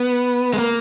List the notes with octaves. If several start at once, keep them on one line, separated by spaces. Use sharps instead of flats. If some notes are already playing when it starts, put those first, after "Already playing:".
Already playing: B3
G#3
A#3